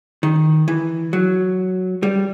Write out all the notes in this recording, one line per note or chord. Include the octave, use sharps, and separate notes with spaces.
D#3
E3
F#3
G3